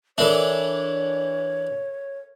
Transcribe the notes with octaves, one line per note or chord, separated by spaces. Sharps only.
E3 D4 A4 A#4 C#5 E5